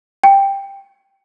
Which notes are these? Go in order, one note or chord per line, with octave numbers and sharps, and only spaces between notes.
G5